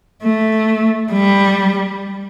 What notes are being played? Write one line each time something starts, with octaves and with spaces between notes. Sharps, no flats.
A3
G3